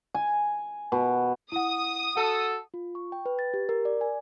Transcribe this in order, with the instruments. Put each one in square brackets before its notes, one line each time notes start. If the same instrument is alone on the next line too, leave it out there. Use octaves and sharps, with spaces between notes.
[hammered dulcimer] G#5
B2
[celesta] E4 F#5 [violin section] D#6
[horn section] F#4 A4 [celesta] F#5
[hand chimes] F4
C#6
G5
B4
A6
G4
A#4
D5
G#5